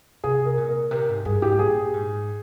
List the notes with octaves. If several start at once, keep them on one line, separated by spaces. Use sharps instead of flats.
C3 G#4
A#4
A#2
A#4
C3 A#4
G#2
G2 G#4
G#2 G4
A#2 G#4
G#2